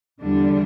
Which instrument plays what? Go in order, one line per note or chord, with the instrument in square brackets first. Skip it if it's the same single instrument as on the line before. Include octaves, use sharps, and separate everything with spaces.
[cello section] E2 D3 G3 D4